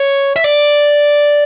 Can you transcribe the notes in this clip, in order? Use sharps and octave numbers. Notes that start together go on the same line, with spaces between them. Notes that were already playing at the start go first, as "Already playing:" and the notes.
Already playing: C#5
E5
D5